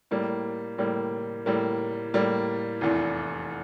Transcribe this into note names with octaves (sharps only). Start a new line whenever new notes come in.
A2 G3 A#3
A2 G3 A#3
A2 G3 A#3
A2 G3 A#3
F1 E2 E3